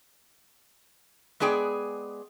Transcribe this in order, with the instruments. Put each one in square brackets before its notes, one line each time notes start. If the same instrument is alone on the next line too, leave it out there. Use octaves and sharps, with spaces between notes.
[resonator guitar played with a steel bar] G#3 B3 G#4 D5 G5